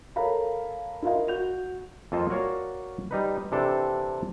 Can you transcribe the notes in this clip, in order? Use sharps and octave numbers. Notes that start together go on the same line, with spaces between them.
A4 A#4 C#5 F5 A#5 B5
E4 F4 A#4 D#5 F5
F#4 G6 F7
F2 A#3 F4 A4 C5 D#5
F#4 A#4 C#5 D5 F5
G3 D#4 B4
C3 E3 D4 A4 G5 A5